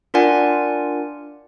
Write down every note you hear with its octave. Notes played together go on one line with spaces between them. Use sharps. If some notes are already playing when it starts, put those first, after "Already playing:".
D4 F4 A#4 D5 F#5 G#5